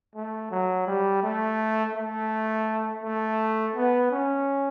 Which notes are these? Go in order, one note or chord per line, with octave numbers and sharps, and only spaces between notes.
A3
F#3
G3
A3
A3
A3
B3
C#4